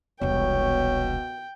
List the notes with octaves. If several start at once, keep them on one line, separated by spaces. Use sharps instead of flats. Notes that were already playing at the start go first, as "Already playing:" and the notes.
E1 C2 B2 C#5 G5